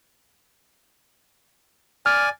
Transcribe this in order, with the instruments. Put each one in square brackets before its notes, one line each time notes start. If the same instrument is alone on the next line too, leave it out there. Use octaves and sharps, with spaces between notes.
[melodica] D5 G#5 [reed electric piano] F6